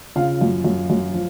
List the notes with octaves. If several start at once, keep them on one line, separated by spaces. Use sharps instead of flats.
C#3 F4 F5
F#2
F#2
F#2
F3